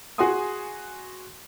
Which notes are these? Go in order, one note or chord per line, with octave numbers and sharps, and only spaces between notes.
F#4 G#4 F#5 G#5 C6 D#6